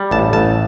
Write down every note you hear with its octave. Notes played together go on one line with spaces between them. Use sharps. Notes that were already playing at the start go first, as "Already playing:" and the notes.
Already playing: G3
A1 A5
A1 A5